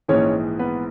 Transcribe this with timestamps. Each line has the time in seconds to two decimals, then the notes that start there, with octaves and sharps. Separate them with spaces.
0.08 A#1 G#2 E3 G#3 C#4 C#5
0.59 B3 B4